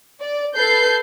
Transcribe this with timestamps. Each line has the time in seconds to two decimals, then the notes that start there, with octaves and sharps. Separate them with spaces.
0.21 D5
0.57 A4 B4 G6 C7